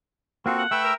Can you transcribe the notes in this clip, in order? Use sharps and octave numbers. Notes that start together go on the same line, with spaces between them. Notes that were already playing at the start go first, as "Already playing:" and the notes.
A#3 C4 F4 F#4 A4
F#5
A3 B4 E5 G5 E6
A#4